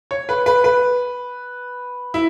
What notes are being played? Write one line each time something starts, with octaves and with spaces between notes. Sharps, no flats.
C#5
B4
B4
B4
E4